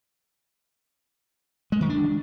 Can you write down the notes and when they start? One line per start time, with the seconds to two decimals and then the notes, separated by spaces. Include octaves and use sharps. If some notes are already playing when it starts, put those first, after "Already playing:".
1.72 G#3
1.81 D#3
1.89 D4